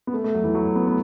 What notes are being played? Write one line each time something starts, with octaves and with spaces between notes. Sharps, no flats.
B3
A3
A3
F#3
E3
F#3
B3
B3